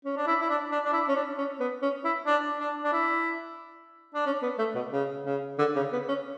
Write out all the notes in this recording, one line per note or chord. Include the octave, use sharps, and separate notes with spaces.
C#4
D4
E4
E4
D4
D4
D4
E4
C#4
D4
C#4
B3
C#4
E4
D4
D4
D4
E4
D4
C#4
B3
A3
B2
C#3
C#3
D3
C#3
B3
C#4